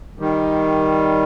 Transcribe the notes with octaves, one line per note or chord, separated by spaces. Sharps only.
D#3 G3